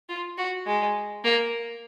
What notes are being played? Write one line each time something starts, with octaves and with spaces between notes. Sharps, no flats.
F4
F#4
G#3
A#3